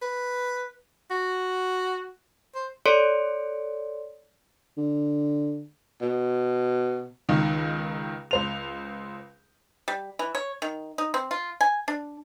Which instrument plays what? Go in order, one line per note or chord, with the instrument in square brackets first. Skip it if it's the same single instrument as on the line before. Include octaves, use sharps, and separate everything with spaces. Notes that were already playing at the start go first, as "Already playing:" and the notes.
[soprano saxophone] B4
F#4
C5
[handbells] A4 C#5 D5 C6 C#7 D7
[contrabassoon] D3
[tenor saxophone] B2
[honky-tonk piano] C#2 D#3
C#2 C5 F7
[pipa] G3
E3
C#5
D#3
D#4
C4
F4
G#5
D4